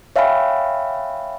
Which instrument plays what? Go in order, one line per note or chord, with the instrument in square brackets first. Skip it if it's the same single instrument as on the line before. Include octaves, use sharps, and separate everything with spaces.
[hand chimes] C#5 E5 F5 G5 G#5 B5